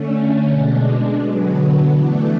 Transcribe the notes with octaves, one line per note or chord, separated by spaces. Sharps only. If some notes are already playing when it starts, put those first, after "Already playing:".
Already playing: D3 A3 C#4
B2 G#3 D4
D3 F#3 B3
E3 A3 D4